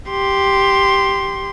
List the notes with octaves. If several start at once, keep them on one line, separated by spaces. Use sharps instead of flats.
G4 C6